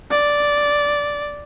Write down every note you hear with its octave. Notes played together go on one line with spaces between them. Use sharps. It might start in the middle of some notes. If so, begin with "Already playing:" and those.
D5